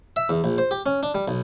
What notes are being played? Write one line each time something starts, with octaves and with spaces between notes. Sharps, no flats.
E5
E2
A#1
C5
G4
C#4
D4
G3
B1